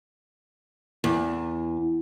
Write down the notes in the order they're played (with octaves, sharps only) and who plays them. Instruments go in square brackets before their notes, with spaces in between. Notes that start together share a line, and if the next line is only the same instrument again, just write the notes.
[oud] E2